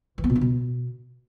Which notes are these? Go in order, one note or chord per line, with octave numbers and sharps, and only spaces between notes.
E3
B3
B2
D4
B2